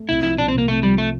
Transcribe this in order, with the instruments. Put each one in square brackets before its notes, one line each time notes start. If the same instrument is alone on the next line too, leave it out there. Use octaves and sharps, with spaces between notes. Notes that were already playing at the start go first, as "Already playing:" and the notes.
Already playing: [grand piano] A3
[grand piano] C2 [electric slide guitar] E4
[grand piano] F3 [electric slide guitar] E4
[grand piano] C2 [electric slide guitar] D4
[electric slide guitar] C4
[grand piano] C3 [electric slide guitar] A#3
[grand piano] C2 [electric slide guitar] A3
[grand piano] F3 [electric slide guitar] G3
[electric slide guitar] A3